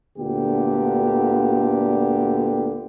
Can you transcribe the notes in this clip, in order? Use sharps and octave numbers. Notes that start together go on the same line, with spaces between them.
D2 A#2 D3 B3 G4